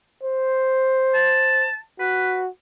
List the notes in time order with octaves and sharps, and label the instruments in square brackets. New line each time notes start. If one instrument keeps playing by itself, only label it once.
[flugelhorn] C5
[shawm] A5
[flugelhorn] F#4 [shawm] B4